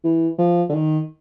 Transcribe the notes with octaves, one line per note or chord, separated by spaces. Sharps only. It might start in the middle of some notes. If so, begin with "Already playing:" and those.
E3
F3
D3
D#3